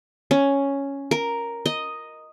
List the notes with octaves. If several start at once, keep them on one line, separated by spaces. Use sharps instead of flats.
C#4
A#4
D#5